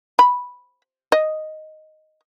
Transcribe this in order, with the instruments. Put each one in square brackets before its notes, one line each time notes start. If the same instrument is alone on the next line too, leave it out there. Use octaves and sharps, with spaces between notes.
[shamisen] B5
D#5